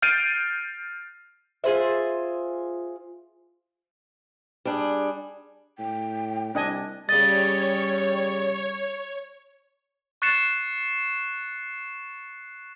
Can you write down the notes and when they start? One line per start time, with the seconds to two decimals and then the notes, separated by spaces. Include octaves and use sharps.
0.02 F6 G6 A6 C7 D7 D#7
1.64 F4 G#4 C5 E5
4.65 G3 D4 G#4
5.79 A2 G5
6.55 C2 D4 D#5 G#5
7.09 C#3 G3 C#5 D#5 A6
10.22 C#6 F#6 A6 C7 C#7 E7